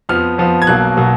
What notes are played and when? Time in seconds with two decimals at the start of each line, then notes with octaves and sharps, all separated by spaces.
0.09 F2 F3 B3 F6
0.38 F2 F3 B3
0.62 G#6
0.67 B1 B2 F#3 A#3 F#6
0.97 B2 F#3 A#3